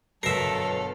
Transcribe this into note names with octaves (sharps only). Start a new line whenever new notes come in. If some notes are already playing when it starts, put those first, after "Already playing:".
G1 B2 F#3 A4 A#4 E5 F5 C7